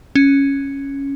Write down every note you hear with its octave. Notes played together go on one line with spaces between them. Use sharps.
C#4